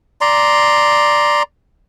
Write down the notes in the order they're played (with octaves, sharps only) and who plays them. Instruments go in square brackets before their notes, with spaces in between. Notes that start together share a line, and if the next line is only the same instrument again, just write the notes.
[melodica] D5 A#5 C6